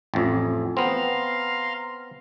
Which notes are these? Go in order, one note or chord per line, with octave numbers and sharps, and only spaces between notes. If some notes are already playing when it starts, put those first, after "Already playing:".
A1 F2
B3 C4 F5 A#5 C6